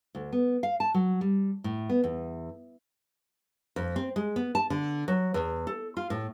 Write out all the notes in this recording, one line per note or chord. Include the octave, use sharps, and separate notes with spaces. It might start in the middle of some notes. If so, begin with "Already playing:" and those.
D2
B3
F5
A5
F#3
G3
A2
B3
E2
F2
C4
G#3
B3
A5
D3
F#3
E2
A4
F4
A2